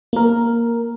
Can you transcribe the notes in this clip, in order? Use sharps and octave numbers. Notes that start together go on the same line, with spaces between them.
A#3 A#4